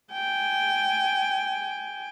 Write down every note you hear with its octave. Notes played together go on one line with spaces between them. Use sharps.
G5 G#5